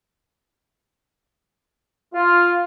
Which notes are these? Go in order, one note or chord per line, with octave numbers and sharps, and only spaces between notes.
F4